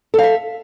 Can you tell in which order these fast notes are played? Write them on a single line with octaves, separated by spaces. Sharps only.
A4 F5 E5